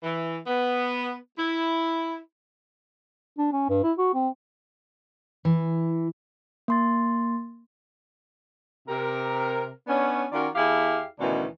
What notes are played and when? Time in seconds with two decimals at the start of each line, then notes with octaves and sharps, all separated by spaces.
0.03 E3
0.47 B3
1.38 E4
3.38 D4
3.52 C#4
3.69 G2
3.84 E4
3.98 F#4
4.14 C4
5.45 E3
6.68 A#3 C6 A6
8.88 C3 A#4
9.87 B3 C#4 D4
10.32 D#3 C#4 F4 F#4 A#4 D5
10.55 E2 E4 G4 G#4 F5
11.19 D2 B2 D#3 E3 C#4 D4